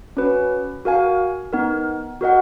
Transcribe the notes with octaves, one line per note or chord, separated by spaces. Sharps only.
C#4 F#4 B4
F#4 A#4 F5 G#5
B3 D#4 A#4
F#4 A#4 D#5 F#5